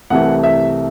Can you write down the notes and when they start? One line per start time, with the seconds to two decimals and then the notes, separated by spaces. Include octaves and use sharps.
0.10 C2 C3 E3 A3 F#5
0.43 E5